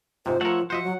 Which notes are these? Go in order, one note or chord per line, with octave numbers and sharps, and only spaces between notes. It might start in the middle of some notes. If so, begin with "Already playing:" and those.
G#2 C3 F4 C5
F3 A3 A#4 C#5 E5 F#5
F3 F#4 C5 D#5 E5 F#5
F#3